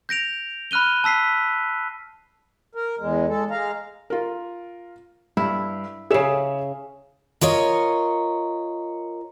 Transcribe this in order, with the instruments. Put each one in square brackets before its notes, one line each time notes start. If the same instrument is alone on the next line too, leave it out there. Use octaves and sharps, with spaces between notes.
[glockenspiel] G6 A#6 D7 F7
B5 F6 F#6 D#7 G7
A5 E6 B6 C7
[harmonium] A#4
E2 G#3
G#3 A4
G#3 F5 A#5
[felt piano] F4 A#4
[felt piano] G2 [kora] E4
[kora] C#3 E5 [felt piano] G#4 C#5 E7
[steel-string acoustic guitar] F4 A#4 C#5 D#5